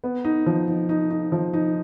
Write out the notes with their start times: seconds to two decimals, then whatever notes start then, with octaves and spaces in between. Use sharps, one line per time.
0.04 B3
0.25 D#4
0.46 F3
0.68 D#4
0.89 D#4
1.11 D#4
1.32 F3
1.53 D#4